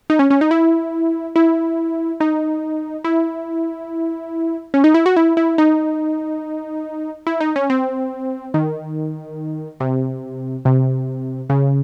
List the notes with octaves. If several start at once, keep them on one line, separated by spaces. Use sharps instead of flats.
D#4
C#4
C#4
D#4
E4
E4
D#4
E4
C#4
D#4
E4
F#4
E4
E4
D#4
E4
D#4
C#4
C4
D#3
C3
C3
C#3